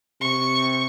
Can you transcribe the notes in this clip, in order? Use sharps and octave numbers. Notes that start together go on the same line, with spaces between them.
C3 C#6